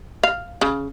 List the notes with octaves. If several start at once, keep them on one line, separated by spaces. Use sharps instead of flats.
F5
C#3